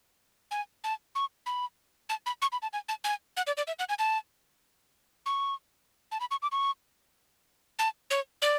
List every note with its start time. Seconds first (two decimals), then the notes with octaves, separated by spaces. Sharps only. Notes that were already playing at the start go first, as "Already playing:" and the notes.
0.51 G#5
0.84 A5
1.15 C#6
1.46 B5
2.09 A5
2.26 B5
2.42 C#6
2.52 B5
2.62 A5
2.73 G#5
2.89 A5
3.04 G#5
3.37 F#5
3.47 D5
3.57 D5
3.67 E5
3.79 F#5
3.89 G#5
3.99 A5
5.26 C#6
6.12 A5
6.20 B5
6.31 C#6
6.42 D6
6.52 C#6
7.79 A5
8.11 C#5
8.42 D5